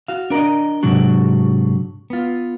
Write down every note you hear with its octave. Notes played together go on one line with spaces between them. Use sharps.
F#4 F5
D4 A#4 D5 D#5
G#2 C3 F#3 D4 F#4
B3 F4